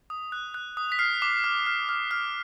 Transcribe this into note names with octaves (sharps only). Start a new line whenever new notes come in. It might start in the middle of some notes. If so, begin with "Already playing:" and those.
D#6
F#6
F#6
D#6
B6
F6 C7
D6
F6
F6
F6
F6